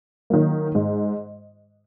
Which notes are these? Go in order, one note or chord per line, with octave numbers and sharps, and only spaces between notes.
D#3 F#3 A#3
G#2